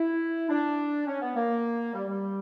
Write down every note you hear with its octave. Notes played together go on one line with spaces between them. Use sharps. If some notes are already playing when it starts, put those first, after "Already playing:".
Already playing: E4
D4
C#4
B3
A#3
G3
G3